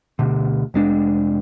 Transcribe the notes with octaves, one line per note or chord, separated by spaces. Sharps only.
D2 B2 D3
F1 G#3 D4